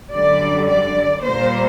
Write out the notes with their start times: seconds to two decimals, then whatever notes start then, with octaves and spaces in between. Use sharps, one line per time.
0.12 F#2 D3 G3 D5
0.67 D5
1.22 A#2 G3 A#3 C5